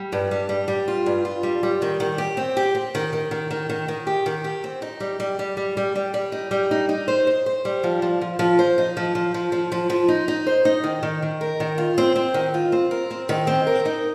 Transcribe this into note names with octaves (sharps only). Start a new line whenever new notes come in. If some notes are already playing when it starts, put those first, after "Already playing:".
Already playing: G3
G2
G3
G3
G3
F4
G2
F4
G3
G3
D#3
D#3
G4
C4
G4
C4
D#3
D#3
D#3
D#3
D#3
D#3
G4
D#3
G4
C4
D#4
G3
G3
G3
G3
G3
G3
G3
D#4
G3
D#4
D#4
C5
C5
C5
G3
F3
F3
F3
F3
C5
D#4
F3
F3
F3
F3
F3
F3
D#4
D#4
C5
D#4
D#3
D#3
D#3
A#4
D#3
F4
C4
C4
D#3
F4
C4
A#4
C4
D#3
C4
A#4
D#4